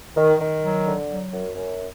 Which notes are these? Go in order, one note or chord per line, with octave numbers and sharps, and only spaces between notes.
D#3
D#3
F#3
D3
F#3
F#2
F#2